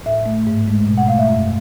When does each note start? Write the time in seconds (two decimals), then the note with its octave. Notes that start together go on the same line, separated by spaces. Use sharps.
0.06 A2 E5
0.26 A3
0.47 G#2
0.68 G#3
0.88 B2
0.98 F#5
1.08 A3 F5
1.19 E5
1.29 F#2